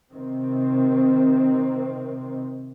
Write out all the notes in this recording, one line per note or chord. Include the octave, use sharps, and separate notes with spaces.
C3 D#3 C4